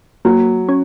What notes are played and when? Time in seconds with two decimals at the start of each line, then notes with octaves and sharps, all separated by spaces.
0.25 F#3 A#3
0.69 C#4